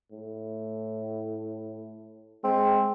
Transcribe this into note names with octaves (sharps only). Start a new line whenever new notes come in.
A2
G#3 C4